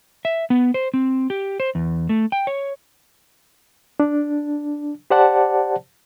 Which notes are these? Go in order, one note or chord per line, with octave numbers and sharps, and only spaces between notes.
E5
B3
C5
C4
G4
C5
E2
A3
G5
C#5
D4
G4 C5 D5 F#5 A5